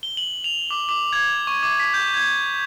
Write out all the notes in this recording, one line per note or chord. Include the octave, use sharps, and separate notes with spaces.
G7
F#7
F7
D6
D6
G#6
C#6
D6
B6
G6
G#6